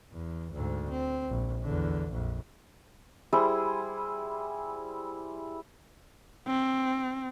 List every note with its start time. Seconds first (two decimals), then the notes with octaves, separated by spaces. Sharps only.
0.12 E2
0.52 D2 G#2
0.90 C4
1.30 A#1
1.63 E2 D3
2.11 A#1 F2
3.33 G3 E4 G#4 C5
6.47 C4